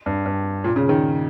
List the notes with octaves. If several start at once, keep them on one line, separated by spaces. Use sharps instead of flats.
G2
G2
A#2
C#3
D#3